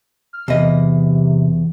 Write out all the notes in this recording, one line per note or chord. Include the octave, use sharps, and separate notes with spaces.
F6
E2 C3 D#5